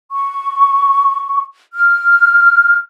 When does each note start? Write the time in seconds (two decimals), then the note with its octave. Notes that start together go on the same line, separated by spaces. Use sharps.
0.12 C#6
1.74 F6